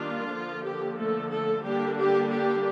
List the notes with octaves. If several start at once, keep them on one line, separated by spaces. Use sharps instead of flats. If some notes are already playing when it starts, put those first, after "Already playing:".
Already playing: D#3 G3 A#3 D4 F4
D3 F3 A#3
G4
A3 A4
A3 A4
D3 G3 A#3 D4 G4
G4
G4